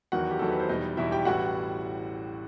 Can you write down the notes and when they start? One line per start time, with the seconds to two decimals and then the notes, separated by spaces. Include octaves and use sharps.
0.12 E2 D#3 F#3 F#4 F#5
0.31 G4
0.39 E2 D#3 F#3 A4
0.50 B4
0.60 C5
0.69 E2 B2 G3 D#4 D#5
0.97 E2 B2 G3 E4 E5
1.11 G4 G5
1.25 A1 A2 E3 G3 F#4 F#5